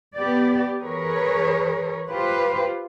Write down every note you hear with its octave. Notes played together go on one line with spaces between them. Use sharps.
B3 G4 D5
E3 G#4 A#4 B4 C#5
F4 G4 B4 C5